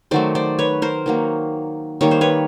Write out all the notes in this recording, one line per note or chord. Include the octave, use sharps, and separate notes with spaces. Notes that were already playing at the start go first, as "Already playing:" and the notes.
D#3 F#3 A3 C5 D5
C5 D5
B4 C#5
A#4 C5
D#3 F#3 A#3
D#3 G3 A#3 C#5
C5
B4 C#5